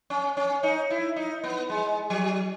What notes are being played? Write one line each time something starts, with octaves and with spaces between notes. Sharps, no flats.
C#4
C#4
D#4
E4
D#4
B3
G#3
F#3